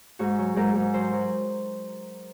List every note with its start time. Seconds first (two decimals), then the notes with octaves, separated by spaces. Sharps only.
0.19 G#2 F#4
0.38 F#3
0.56 G#2 A#4
0.75 G#2
0.94 F#3 C5
1.13 F#3